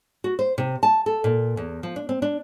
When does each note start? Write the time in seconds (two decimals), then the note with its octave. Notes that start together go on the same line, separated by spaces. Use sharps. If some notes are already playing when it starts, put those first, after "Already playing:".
0.24 F#4
0.39 C5
0.58 C3
0.83 A5
1.06 A4
1.24 A#2
1.57 E2
1.83 F3
1.96 D4
2.09 C4
2.22 D4